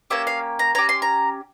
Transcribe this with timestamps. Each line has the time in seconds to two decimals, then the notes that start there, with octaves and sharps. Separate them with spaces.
0.10 A#3 C#4 G4 E5
0.27 F5
0.59 A#5
0.75 C#4 G4 A#5
0.89 C6
1.02 A#5